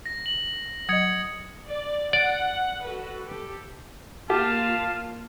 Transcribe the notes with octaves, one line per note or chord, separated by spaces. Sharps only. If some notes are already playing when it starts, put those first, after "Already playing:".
A#6
F#7
F#3 D#5 D#6 G#6 C#7
D5
D5 F#5
F#4 A4 B4
G4 A4
A#3 F4 G4 F5 A5